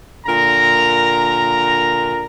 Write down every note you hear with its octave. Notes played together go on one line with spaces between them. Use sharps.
A#2 D3 A#4 A#5